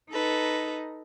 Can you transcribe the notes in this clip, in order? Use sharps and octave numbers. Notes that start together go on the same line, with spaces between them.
D#4 A4 B4 A#5